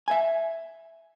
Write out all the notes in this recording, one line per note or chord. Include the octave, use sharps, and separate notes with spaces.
E5 G#5